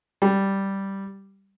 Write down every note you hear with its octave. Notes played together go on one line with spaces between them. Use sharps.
G3